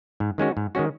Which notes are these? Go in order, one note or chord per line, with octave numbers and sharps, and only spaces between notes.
G#2
D#3 G#3 C#4 F#4
G#2
D#3 G#3 C#4 F#4